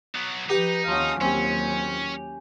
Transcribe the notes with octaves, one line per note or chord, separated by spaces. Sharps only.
F#3 B3
F3 D#4 G4 B4 G5
D#2 F3 C#4 F#4 F5 D#6
D#2 A#2 F#3 C4 C#4 G4 G#5